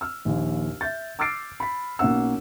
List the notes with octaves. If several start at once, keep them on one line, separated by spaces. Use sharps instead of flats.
E6 F6
A#1 D#2
E5 G6 A6
D6 E6 F6 A6 C7 D7
B5 B6
B1 A#3 C#4 F#5 E6